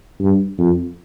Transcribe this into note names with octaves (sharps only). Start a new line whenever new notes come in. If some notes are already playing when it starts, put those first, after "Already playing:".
G2
F2